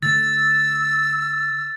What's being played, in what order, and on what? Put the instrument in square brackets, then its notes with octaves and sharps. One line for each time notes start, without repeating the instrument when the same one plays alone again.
[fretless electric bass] D3 A3 [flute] E6 [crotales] A6